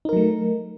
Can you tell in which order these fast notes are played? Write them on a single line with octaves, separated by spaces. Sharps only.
D#4 A#4 F#3 A3